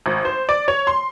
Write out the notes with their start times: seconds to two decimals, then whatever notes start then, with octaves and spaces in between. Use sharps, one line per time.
0.06 G#1
0.25 C5
0.49 D5
0.68 C#5
0.87 C6